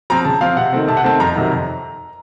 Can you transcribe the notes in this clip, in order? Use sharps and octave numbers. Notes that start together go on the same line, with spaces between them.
F3 C4 A#5
C#3 A5
F3 C4 F5
C3 F#5
D#3 A3 C4
C3 A5
F#5
D#3 A3 C4 A5
F2 A#5
C3 D#3 F#3
F2